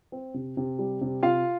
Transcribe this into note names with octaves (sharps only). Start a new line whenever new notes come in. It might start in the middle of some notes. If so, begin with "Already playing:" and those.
C4
C3
C3
G3
C3
C3 F4 F5